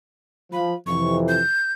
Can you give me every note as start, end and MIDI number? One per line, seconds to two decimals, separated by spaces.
0.52 0.74 53
0.52 0.74 83
0.87 1.41 41
0.87 1.41 48
0.87 1.41 52
0.87 1.17 85
1.28 1.72 91